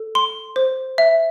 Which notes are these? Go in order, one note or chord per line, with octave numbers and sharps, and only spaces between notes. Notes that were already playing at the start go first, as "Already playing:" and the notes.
Already playing: A4
C6
C5
E5